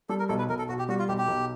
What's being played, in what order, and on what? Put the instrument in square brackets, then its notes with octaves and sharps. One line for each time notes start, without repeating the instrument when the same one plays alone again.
[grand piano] G3 [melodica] A4
[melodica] A#4
[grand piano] B1 [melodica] A4
[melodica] B4
[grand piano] B1 [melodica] A#4
[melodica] A4
[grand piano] B2 [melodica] F#4
[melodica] G4
[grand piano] G3 [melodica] F#4
[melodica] F4
[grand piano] B1 [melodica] G4
[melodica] G4
[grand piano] B1